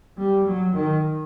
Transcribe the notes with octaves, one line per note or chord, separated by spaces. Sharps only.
G3
F#3
D#3